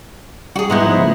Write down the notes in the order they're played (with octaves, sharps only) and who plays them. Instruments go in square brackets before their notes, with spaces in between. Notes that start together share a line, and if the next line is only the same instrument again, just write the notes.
[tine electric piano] G3 [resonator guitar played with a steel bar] F#4 G#4
[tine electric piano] G#2 A#5 G6 [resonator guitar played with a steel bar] G#3 B3 E4
[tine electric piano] F3 D#4
C#3 A3